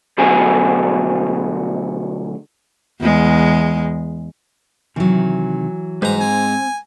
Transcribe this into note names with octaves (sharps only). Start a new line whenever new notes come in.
D2 B2 F#3 G#4
E2 G#3
C3 D#3 E3 F#3
G#2 G3 B4 C5 A#5
C4 G#5